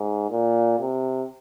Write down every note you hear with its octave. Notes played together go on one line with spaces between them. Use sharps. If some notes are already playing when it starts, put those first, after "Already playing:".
Already playing: G#2
A#2
C3